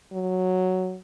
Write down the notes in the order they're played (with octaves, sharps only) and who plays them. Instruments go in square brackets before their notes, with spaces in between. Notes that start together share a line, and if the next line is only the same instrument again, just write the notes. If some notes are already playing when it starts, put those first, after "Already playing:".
[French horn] F#3